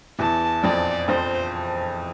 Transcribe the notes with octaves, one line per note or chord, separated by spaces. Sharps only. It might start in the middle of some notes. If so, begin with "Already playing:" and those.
E2 E3 A5
F2 F3 D5
F2 F3 C5